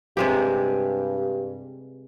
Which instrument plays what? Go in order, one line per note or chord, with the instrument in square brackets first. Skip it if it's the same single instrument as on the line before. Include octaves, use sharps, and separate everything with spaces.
[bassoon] G2 [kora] C3 G#3 G4